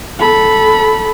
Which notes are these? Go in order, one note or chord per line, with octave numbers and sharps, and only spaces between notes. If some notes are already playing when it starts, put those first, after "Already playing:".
A4 B5